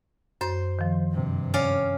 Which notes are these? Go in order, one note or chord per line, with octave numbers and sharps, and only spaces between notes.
F#2 C5
D#3 F3
G2 C3
C#4 D5 F5